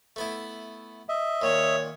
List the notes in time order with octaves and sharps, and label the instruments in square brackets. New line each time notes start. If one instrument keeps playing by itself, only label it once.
[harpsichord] A3 B3 E4
[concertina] D#5 E5
[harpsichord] A#2 D#3 [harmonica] C#5